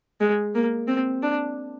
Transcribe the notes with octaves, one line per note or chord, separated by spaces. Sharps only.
G#3
A#3
C4
D4